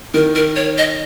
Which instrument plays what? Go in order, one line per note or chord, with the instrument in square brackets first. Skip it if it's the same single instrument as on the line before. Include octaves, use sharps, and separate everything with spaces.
[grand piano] D#3 [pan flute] A#4
[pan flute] A#4
C#5
D#5